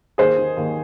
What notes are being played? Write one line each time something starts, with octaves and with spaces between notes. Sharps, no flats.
D#2 G#4 C5
D#3
D#2